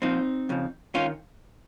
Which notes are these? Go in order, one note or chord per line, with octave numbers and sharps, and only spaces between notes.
A#2 F3 C4 D#4
F2 C#3 F3
D#3 C#4 F4